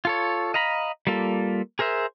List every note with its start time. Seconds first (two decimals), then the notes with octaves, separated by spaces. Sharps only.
0.05 F4 A4 C#5
0.54 D#5 F5 A#5 B5
1.07 G3 A#3 F4 A4
1.79 G#4 A#4 C5 E5